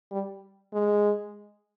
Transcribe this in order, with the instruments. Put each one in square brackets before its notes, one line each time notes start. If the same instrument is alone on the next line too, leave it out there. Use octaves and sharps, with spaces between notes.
[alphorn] G3
G#3